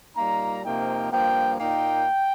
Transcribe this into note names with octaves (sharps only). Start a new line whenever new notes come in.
A#2 G3 A#3 D#4 A#5
C3 F3 A#3 D#4 G5
G2 F3 A#3 G5
A#2 A#3 D#4 G5